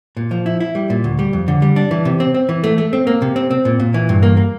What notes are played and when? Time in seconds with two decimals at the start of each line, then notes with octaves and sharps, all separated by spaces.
0.17 A#2
0.31 F3
0.46 E4
0.60 E4
0.75 G3
0.90 A#2
1.04 D2
1.19 G3
1.33 F2
1.48 D3
1.62 G3
1.76 D4
1.91 E3
2.05 C3
2.20 C4
2.34 C4
2.49 E3
2.64 A3
2.78 A3
2.93 C4
3.07 A#3
3.22 C3
3.36 C4
3.51 C4
3.65 A#2
3.80 A#2
3.94 E3
4.09 G2
4.23 A#3
4.37 A#3